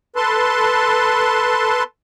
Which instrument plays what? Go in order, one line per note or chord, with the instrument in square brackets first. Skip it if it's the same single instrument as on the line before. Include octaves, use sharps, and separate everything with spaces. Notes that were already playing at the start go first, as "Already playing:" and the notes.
[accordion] A4 B4 A5 C6